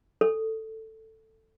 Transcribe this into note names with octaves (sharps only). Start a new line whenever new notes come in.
A4